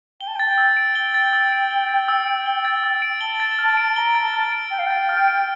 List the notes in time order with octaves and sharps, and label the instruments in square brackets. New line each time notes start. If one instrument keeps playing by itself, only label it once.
[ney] G5 [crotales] G7
[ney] A5
G5
[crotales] A6
[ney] G5
[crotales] E6
D7
[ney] G5 [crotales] G7
[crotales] A6
E6
D7
G7
A6
E6
D7
G7
A6
E6
D7
[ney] A5 [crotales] G7
[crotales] A6
F6
D7
[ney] A#5 [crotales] G7
[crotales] A6
[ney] A5
[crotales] F6
D7
[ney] G5 [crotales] G7
[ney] F5
[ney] G5 [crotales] A6
[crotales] F6
D7